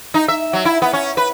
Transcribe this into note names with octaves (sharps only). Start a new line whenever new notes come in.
D#4
E5
F#3
E4
B3
C#4
B4